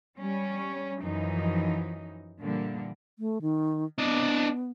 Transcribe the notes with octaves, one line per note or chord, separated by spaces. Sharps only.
G3 C#4
F#2 E3 F3 D#4
A#2 D3 E3 G3 A#3
A3
D#3
B3 D4 D#5